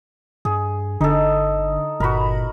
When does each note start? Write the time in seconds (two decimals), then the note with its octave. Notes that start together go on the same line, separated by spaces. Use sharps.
0.45 G2 G#4
1.01 G1 D3 D#4 A4
2.00 G1 A#2 F#4 A#4 B5